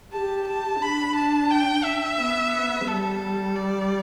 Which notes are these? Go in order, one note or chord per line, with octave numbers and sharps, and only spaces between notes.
G4 A5
A5
D4 B5
A5
G5
E5
B3
G3 A4
D5